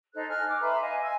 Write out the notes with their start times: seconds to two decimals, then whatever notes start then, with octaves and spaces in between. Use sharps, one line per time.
0.14 D#4 A4 C5 F#6
0.28 G#5 F6 F#6
0.48 D6
0.61 B4 E5 A#5 C6
0.81 D#5 F5 G#5
1.02 G#5 E6 G#6